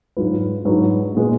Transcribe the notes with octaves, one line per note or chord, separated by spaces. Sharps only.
G#2 F#3 D4 F4 B4
G#2 F#3 D4 F4 B4
A#2 G#3 B3